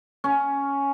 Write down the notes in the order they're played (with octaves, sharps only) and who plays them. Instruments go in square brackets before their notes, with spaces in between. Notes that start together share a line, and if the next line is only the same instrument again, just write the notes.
[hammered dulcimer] C#4